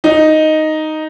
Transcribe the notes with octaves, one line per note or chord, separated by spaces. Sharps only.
D#4